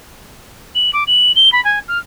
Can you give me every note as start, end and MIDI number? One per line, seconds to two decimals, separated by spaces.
0.75 0.91 102
0.93 1.03 86
1.07 1.32 102
1.35 1.52 103
1.52 1.62 83
1.64 1.79 80
1.88 1.98 89